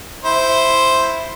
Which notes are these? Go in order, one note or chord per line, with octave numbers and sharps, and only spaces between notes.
E4 C5